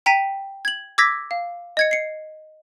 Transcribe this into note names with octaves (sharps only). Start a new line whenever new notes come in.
G5 A#5 B6 D#7
G#6 F#7
D6 E6 G#6 A#6 B6
F5
D#5 G#6 C#7
C7 C#7